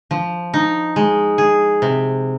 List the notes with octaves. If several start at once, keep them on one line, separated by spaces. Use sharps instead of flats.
F3
D#4
G#3
G#4
C3